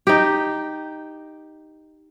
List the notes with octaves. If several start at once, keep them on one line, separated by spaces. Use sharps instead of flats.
D#4 G4